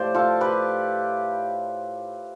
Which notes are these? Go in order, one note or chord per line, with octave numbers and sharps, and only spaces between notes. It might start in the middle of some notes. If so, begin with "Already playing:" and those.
Already playing: A2 F3 A3 G4 C5 D5
F4 A4
G4 B4